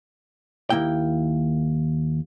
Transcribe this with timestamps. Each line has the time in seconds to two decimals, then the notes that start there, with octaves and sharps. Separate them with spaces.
0.70 D#2 G#3 A#3 E4 G5